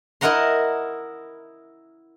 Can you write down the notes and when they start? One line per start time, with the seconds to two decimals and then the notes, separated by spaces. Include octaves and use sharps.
0.21 E4 A#4 D#5 F#5 A#5 C6